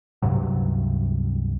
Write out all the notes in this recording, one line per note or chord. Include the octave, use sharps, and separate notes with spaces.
C#2 G2 C3 F#3